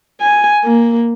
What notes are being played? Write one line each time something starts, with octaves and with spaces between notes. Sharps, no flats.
G#5
A#3